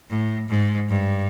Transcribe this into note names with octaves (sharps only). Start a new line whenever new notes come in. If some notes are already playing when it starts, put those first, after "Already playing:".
A2
G#2
G2